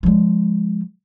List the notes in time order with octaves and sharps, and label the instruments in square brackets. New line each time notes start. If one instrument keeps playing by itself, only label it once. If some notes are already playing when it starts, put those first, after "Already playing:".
[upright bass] F3 G#3